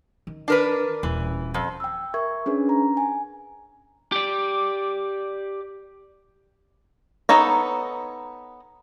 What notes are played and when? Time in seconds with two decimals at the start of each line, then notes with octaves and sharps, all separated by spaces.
0.27 D#3
0.48 D4 A#4 B4
1.03 D#1 E3
1.54 F2
1.80 G5 E6
2.14 A#4 E5 C#6 G#6
2.46 C#4 D4 G#4 B4
2.69 A#5
2.97 G#5
4.12 G4 D5
7.29 B3 D#4 A4 C#5 A#5